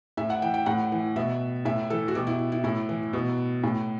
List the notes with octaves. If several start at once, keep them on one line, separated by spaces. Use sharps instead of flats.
A2 E5
F#5
E3 G5
G5
A2 F#5
E3
B2 E5
A2 E5
E3 A4
F#4
B2 G4
E4
E4
A2 E4
E3
B2
A2